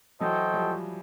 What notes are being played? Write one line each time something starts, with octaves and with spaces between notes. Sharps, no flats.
E3 F#3 F#4 A4 C5 D#5 G5
F3 G3